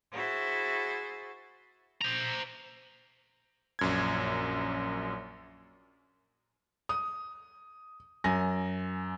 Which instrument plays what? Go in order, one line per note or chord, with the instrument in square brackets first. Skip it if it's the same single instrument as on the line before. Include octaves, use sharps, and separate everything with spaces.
[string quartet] E4 F#4 G#4 C5 A6
[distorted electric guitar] C5 A#5
[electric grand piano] A#1 F#2 G#6
[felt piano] D#6
F#2 G#5 A#6